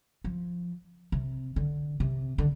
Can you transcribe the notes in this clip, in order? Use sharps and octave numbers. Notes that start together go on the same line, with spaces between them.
F3
C3
D3
C3
D3